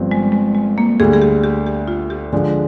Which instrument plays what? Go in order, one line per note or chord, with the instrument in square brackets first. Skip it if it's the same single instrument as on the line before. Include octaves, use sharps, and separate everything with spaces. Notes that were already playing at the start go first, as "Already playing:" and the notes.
Already playing: [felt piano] G1 G2 F3 C4
[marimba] G#3
G#3
G#3
A#3
[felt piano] D2 D3 G3 [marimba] G#4
[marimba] G#4
G4
G4
G4
F4
G4
[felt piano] D3 F3 G#3 D4 [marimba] G4